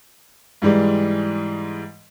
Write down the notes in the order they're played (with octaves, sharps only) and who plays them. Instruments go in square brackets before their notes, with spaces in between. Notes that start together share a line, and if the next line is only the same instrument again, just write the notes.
[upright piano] G#2 E3 G3 G#3